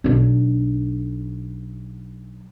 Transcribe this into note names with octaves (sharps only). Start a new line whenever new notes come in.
B1 D4